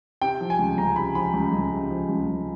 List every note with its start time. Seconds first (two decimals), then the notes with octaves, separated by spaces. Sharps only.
0.22 C3 G5
0.41 F3
0.50 G#5
0.59 C#2
0.78 C#2 A#5
0.96 C3 B5
1.15 F3 B5
1.34 C#2
1.52 C#2
1.71 C3
1.91 F3
2.09 C#2
2.27 C#2